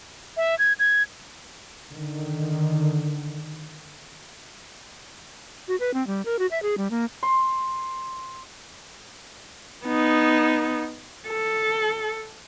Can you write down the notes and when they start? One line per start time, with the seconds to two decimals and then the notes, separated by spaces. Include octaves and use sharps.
0.37 E5
0.59 G#6
0.79 G#6
1.92 D3 D#3
5.68 F#4
5.80 B4
5.94 C4
6.07 G3
6.25 A#4
6.39 F#4
6.51 E5
6.63 G#4
6.78 G3
6.91 A#3
7.23 C6
9.86 B3 D#4
11.28 A4